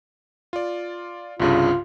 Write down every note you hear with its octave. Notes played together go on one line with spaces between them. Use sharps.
F4 D5
C2 G2 C#3 F4